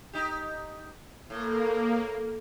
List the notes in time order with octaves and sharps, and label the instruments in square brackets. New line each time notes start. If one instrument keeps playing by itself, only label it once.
[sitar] D#4 G4
[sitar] A2 [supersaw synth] A#3